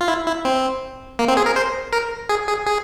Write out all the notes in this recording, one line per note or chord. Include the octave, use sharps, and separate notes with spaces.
F4
E4
E4
C4
A#3
C4
G#4
A#4
C5
A#4
G#4
G#4
G#4